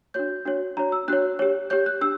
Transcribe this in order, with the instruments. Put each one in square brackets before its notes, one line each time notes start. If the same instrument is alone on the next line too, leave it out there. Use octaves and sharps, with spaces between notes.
[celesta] D4 F#4 C#5 G6
D4 F#4 C#5
D4 F#4 C#5 A#5
E6
D4 F#4 C#5 F#6
G4 C#5
G4 C#5 G6
F#6
D4 G4 E6